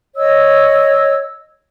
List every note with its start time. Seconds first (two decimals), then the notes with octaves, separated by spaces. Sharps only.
0.16 C#5 D#5 E6